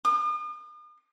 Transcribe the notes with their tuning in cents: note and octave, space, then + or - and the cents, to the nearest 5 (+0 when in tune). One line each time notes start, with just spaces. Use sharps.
D#6 -45